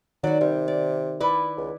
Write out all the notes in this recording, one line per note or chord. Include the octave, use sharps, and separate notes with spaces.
D#3 F#3 F#4 D5
C3 G3
D5
E4 B4 D5
C#2